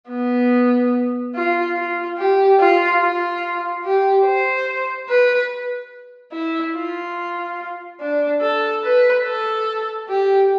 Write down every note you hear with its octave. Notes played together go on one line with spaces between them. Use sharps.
B3
F4
F4
G4
F4
F4
G4
C5
B4
E4
F4
D4
A4
B4
A4
G4